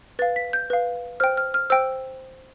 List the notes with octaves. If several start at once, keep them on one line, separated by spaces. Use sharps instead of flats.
B4 F5 A6
B6
G6
B4 F5
C5 G5 F6
F6
F6
C5 G5 E6